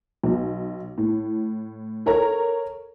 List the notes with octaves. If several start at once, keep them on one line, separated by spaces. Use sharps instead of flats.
B1
A2
A4 A#4 C#5 A#5